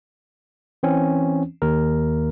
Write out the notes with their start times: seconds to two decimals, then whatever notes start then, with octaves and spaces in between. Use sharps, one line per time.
0.83 E3 C4 C#4
1.62 D#2 A#4